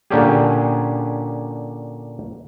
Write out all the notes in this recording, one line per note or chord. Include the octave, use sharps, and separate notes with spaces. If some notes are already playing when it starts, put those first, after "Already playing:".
A#2 D3 C#4 D4 G4 G#4